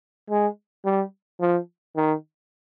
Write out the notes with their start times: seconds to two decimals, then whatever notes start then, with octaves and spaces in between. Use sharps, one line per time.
0.30 G#3
0.85 G3
1.41 F3
1.96 D#3